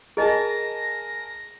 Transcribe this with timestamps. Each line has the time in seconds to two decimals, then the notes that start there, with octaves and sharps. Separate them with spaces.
0.17 G#4 A#4 D#5 G#5 A5 A#6